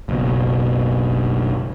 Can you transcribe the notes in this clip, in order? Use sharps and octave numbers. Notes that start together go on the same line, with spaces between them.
F#1 B1 B2